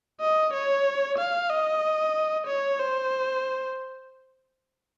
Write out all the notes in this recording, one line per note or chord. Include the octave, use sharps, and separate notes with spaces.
D#5
C#5
F5
D#5
C#5
C5